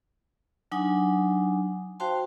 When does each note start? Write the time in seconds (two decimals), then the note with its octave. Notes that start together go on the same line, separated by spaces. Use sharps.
0.72 F#3 D4 D#4 F#5 G#5
2.00 F#4 C5 F5 G5 A5 C6